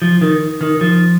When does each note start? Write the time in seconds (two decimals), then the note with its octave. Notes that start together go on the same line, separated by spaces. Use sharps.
0.02 F3
0.21 D#3
0.61 D#3
0.81 F3